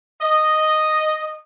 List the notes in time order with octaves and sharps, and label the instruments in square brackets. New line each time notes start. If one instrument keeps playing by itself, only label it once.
[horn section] D#5